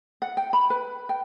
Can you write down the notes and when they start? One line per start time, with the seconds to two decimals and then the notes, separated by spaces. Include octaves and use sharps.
0.22 F#5
0.37 G5
0.53 B5
0.70 B4
1.09 G5